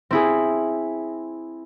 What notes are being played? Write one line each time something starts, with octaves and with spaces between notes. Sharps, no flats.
C4 E4 G#4